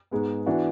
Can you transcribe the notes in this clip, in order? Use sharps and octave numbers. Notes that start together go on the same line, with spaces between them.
G#2 G#3 B3
E3 B3 D4 F#4